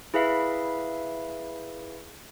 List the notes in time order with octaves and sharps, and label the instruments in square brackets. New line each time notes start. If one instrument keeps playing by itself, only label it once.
[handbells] E4 G#4 B4 E5 F5